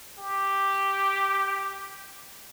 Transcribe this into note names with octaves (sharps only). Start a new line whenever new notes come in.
G4